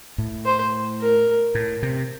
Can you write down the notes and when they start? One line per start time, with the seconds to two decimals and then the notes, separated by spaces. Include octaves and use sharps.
0.18 A2
0.45 C5
1.00 A#4
1.55 A2
1.82 C3